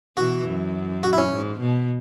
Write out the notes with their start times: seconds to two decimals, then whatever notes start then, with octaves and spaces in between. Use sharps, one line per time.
0.17 B2 E3 F#4
0.47 F#2
1.03 F#4
1.13 E4
1.18 C#4
1.32 G#2
1.61 B2